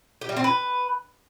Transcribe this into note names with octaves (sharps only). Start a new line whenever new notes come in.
G4
G3
C4
B4